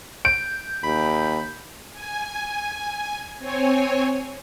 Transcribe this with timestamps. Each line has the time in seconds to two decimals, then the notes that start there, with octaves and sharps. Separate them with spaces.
0.25 G6 D7
0.84 D#2 B5
1.93 G#5
3.39 C4 C#5 G#5